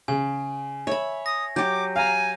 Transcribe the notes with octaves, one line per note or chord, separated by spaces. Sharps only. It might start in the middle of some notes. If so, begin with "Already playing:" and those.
C#3 G#5
C#5 E5 B5
D#6 A#6
F#3 G4 D6 G6
F5 G#5 A#5